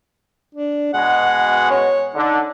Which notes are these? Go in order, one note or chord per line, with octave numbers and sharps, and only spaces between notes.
D4
B2 G#3 F#5
C#5
D3 D#4